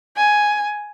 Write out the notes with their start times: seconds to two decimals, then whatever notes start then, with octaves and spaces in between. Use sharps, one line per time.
0.17 G#5